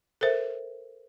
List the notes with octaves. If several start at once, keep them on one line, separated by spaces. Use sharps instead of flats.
A4 A#4 C5 E5